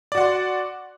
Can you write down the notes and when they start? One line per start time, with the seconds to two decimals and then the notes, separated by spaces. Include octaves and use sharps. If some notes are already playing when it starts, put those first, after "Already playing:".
0.12 D5
0.15 F#4
0.18 F#5
0.21 C6